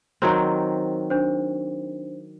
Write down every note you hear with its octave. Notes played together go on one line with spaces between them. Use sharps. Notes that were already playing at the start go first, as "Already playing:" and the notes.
D#3 F#3 C4 C5
D4 C5